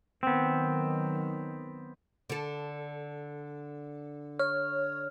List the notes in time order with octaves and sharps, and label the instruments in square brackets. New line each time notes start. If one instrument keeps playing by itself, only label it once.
[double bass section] D#3 F#3 [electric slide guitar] B3 C4
[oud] D3 A4
[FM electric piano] C#5 [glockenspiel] F6